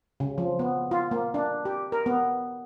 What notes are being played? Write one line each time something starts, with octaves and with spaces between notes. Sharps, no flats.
C#3
F3
B3
F4
A#3
D4
G4
A#4
B3